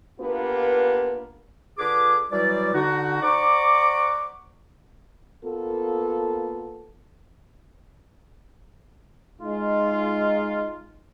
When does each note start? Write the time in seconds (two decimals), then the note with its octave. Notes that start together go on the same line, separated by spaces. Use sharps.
0.20 A#3 B3 D4 F4 G4 B4
1.78 D3 F4 G#4 B4 D6
2.31 E3 F#3 G3 F#4 D5
2.74 D3 D#4 F#4
3.21 C5 D5 F#5 A#5 C#6 D6
5.45 A#3 B3 F4 A4
9.42 G#3 D#4 F4